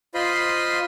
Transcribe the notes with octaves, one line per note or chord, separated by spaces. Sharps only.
F4 C5 D#5 B5 C6